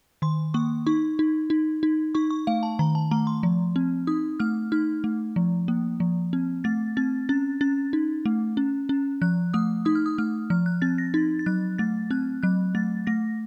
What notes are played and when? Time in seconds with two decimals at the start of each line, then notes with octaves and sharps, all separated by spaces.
0.22 D#3 C6
0.54 A#3 C#6
0.87 D#4 C#6
1.19 D#4
1.50 D#4
1.83 D#4
2.15 D#4 C#6
2.31 C#6
2.47 A3 F5
2.63 A5
2.79 D#3 A#5
2.95 A5
3.11 A3 A#5
3.27 C6
3.43 F3
3.76 C4
4.07 D#4 D#6
4.40 A3 F6
4.72 D#4 F6
5.04 A3
5.36 F3
5.68 A#3
6.00 F3
6.33 C4
6.64 A3 A6
6.97 C4 A6
7.29 C#4 A6
7.61 C#4 A6
7.93 D#4
8.26 A3
8.57 C#4
8.89 C#4
9.22 F3 F#6
9.54 A3 D#6
9.85 D#4 D#6
9.95 F6
10.06 D#6
10.18 A3 F6
10.50 F3 F6
10.66 F#6
10.82 C4 A6
10.98 A#6
11.14 D#4 A6
11.39 A6
11.46 F#3 F#6
11.78 A3 A6
12.11 C4 F#6
12.43 F#3 F#6
12.75 A3 A6
13.07 A3 A#6